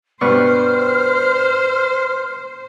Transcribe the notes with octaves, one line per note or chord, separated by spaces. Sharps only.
G2 B2 B4 C5 D5 C#6 F6